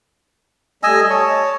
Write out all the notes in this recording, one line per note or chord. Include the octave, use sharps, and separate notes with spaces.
G3 A3 D#5 G#5 E6
C#5 A5